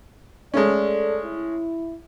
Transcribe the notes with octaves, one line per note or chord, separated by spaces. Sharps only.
G#3 A3 C#4 A4 D5
E4